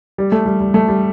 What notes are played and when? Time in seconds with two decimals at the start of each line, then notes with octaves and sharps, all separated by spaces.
0.18 G3
0.32 A3
0.46 G3
0.60 G3
0.74 A3
0.88 G3